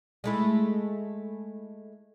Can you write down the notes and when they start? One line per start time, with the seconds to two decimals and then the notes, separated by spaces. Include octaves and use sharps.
0.24 G#3 A3 E4